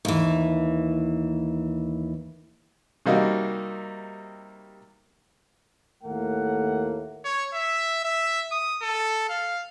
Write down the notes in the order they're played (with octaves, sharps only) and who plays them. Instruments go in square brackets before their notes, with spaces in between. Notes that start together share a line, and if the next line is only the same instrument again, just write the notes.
[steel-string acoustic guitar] D#2 E3
[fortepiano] C3 G3 A#3 D#4 F#4
[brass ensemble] D#2 A2 A3 A#3 F#5
[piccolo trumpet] C#5
E5
E5
D#6
A4
F5